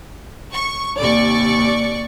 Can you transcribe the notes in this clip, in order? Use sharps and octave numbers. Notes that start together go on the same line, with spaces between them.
C#6
D#2 C3 D5 C#6